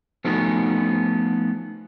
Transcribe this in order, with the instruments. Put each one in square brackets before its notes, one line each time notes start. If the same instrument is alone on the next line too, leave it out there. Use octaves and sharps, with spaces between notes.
[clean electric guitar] F3 A3 B3 C#4 D#4 F#4